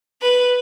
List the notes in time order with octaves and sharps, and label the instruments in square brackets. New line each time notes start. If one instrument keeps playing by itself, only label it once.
[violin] B4